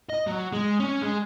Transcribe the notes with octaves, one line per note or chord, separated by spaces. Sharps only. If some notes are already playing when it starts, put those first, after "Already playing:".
D#5
F#3
G#3
C#4
G#3